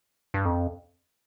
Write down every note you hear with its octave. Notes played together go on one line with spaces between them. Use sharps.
G2
F2